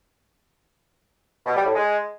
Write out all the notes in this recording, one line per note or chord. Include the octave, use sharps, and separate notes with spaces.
B2
G3
A2
G#3